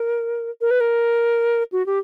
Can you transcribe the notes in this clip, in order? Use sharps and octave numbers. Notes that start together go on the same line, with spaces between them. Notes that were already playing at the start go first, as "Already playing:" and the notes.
Already playing: A#4
A#4
B4
A#4
F#4
G4